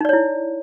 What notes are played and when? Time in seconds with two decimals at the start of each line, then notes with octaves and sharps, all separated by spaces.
0.01 D#4
0.05 D5
0.09 C#5
0.13 E4